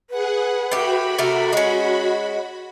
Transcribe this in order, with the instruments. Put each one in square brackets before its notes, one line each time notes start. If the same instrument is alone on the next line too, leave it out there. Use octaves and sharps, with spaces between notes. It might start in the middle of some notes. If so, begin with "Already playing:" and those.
[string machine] G#4 F#5 [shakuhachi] B4
[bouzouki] A2 G4 [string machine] F#4 B5
[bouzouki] C3 A3 A#4
[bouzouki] G#3 C#4 [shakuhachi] D#5